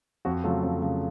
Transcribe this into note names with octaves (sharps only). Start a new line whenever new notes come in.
F2 F#4
C#3 F#3 A3 F4
F2
C#3 F#3 A3